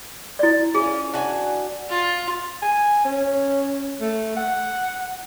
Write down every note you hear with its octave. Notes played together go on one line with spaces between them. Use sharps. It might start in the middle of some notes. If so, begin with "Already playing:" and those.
E4 D5
C#4 F4 G#4
D4 F#4 G#5
F4
G#5
C#4
A3
F#5